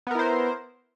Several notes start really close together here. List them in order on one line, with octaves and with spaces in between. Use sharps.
B3 A#4 E4 C5